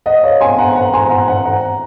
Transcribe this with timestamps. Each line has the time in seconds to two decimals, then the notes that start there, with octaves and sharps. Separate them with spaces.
0.06 D#5 F#5
0.24 C#5 F5
0.40 G#5 C6
0.58 F#5 A#5
0.75 F#5 A#5
0.93 G#5 C6
1.10 F#5 A#5
1.28 F#5 A#5
1.45 F#5 A#5